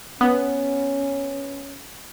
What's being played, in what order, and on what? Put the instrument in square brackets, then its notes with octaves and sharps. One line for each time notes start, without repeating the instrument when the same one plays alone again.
[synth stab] B3 [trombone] C#4